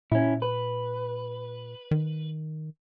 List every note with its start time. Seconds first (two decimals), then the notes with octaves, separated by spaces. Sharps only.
0.12 A#2 C#4 E4
0.42 B4
1.91 D#3